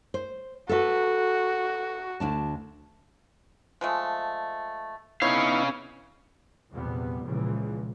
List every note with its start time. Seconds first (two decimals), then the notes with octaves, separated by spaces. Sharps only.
0.14 C5
0.69 F#4 A4 B4
2.20 D2 D4 A5
3.81 F3 G#3 A3
5.22 B3 C#4 D#4 E4 C#5 F5
6.72 A#1 E2 C3 G3 B3
7.25 C#2 A#2 C#3 E3 F3